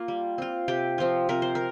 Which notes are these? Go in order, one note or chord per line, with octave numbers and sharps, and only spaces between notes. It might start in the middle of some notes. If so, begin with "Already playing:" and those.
Already playing: A#3 F4
G3
C4 F4
C3 G4
F3 C4 F4
C3 A#4
C5
A#4